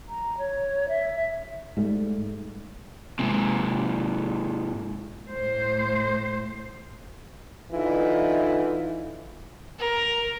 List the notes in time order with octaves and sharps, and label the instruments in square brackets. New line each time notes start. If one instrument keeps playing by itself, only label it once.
[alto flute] A#5
C#5
E5
[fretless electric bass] G#2 G3 A3
[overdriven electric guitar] G#2 C3
[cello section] A2 C5
[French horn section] D3 E3 D#4 F4
[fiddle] A#4